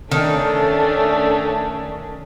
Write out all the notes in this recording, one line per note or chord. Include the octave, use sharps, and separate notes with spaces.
D#3 A3 C#4 D4 A4